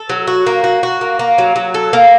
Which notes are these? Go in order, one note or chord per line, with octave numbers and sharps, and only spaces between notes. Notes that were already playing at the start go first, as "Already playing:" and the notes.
Already playing: A4
F#3
F#4
A#3
F#4
F#4
A#3
A#3
F#3
F#3
A4
A#3